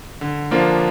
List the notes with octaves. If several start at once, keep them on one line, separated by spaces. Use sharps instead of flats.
D3
F3 A#3 D4 F4